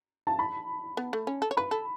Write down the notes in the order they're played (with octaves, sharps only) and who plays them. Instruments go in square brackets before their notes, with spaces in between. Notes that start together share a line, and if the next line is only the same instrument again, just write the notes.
[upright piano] A5
B5
[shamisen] B3
A3
C#4
A4
C#5
[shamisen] B4 [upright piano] B5
[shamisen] A4